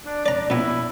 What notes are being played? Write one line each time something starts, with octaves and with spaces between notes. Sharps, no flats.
D4
D4 D5 A#5
A#2 B3 E4